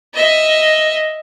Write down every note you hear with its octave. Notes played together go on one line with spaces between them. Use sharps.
D#5 E5